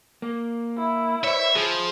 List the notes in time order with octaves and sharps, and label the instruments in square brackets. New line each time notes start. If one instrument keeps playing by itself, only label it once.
[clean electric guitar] A#3
[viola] E4
[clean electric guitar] C5 C#5 [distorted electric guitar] E5
[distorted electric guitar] F3 [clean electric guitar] G#4